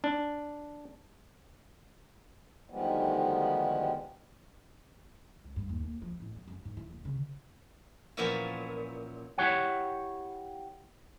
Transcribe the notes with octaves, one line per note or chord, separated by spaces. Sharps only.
D4
D2 D#3 F3 G3 G#3 B3
C#2
G2
D#2
A#3
F3
A1
F#3
F#2
G#2
E3
D#1
C#3
A#2 E3 F3 B3 C#4 E4
E4 G4 C#5 F#5